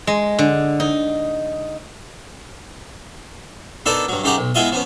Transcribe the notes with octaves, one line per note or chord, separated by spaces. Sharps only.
G#3
D3
D#4
B3 D4 D#4 A4 A#4 D5
G2 F#3
F#2 C#3 D#4 G4 F#5 A#5
B1
G#3 B3 E4 F4 D#5 G#5
F3 B3 C#4